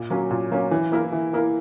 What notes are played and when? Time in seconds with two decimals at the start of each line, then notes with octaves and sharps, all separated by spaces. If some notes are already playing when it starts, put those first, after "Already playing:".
Already playing: A#2
0.10 F#3 A#3 C#4
0.31 A#2
0.51 F#3 A#3 C#4
0.71 E3
0.92 A#3 E4 A#4
1.12 E3
1.33 A#3 E4 A#4